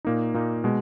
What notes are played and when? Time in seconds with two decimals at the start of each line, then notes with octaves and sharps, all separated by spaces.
0.05 A#2 A#3 D#4
0.34 A#2 A#3 D#4
0.64 B2 G#3